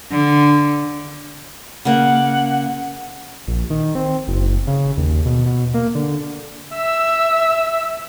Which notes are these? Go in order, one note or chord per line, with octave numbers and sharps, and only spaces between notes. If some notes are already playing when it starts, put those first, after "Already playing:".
D3
C#3 A#3 F#5
A#1
D#3
C4
F#1
C#3
D#2
B2
B2
A#3
D3
E5 E6